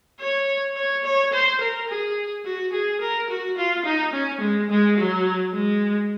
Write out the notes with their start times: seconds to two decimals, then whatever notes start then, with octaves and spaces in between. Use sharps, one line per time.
0.21 C#5
0.76 C#5
1.04 C#5
1.33 C5
1.60 A#4
1.89 G#4
2.45 F#4
2.73 G#4
3.01 A#4
3.30 F#4
3.57 F4
3.85 D#4
4.13 C#4
4.41 G#3
4.70 G#3
4.97 F#3
5.54 G#3